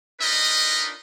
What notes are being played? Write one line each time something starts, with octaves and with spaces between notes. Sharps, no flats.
D4 D#4 F4 A#4 B4 D#5